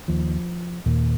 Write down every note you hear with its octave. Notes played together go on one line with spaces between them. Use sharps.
D#2 F3
D#2 A#2 A#3